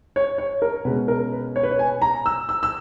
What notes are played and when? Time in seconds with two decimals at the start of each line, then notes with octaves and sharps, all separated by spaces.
0.16 C#5
0.38 C#5
0.62 A#4
0.85 B2 G#3 C#4 B4
1.08 A#4
1.32 B4
1.56 C#5
1.63 B4
1.71 C#5
1.79 G#5
2.02 A#5
2.26 E6
2.49 E6
2.63 E6